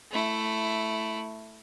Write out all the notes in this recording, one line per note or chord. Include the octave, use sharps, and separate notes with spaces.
A3 E4